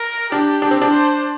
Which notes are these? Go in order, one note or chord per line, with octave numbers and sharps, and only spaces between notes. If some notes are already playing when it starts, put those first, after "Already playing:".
Already playing: A#4
D4 G4
D4
C4
D4
C5